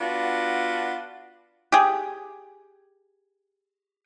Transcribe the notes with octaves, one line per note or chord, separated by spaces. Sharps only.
B3 D4 F4 F#4
G4 G#4